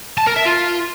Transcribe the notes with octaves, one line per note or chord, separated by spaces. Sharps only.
A5
A#4
E5
F4